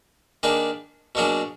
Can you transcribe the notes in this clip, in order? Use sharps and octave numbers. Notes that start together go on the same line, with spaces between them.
D#3 A#3 D4 G#4 B4
B2 F#3 A#3 D4 G#4